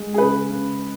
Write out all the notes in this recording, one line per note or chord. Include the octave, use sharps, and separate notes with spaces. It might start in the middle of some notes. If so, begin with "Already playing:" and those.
Already playing: G#3
G#4
C#3 B4
C#3